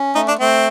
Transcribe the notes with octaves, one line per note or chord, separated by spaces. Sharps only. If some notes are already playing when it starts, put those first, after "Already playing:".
Already playing: C#4
A3 D#4
D4
A3 C4